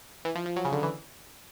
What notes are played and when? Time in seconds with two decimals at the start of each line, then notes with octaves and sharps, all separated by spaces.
0.25 E3
0.35 F3
0.46 F3
0.56 F#3
0.65 C#3
0.72 D3
0.83 E3